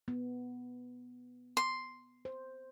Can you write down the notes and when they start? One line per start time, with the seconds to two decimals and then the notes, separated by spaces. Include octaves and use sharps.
0.08 B3
1.57 C6
2.25 C5